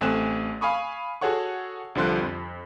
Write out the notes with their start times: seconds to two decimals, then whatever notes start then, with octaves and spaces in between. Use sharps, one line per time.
0.01 A1 A3 C4 G#5 F#6 E7
0.61 F5 G#5 B5 C#6 D#6
1.21 F#4 G#4 A4 C#5 F#5 C#6
1.95 C2 D3 F3 C6 F#6
2.21 F2